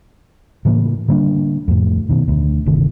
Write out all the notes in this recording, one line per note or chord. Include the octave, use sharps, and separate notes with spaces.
A2 C#3 E3 A#3
D3 G3 A#3 D4
F2 A2
B2 D#3
D2
G1 C3 D#3